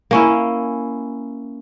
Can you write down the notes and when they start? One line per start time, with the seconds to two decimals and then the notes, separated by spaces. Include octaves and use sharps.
0.11 A#3 C#4 E4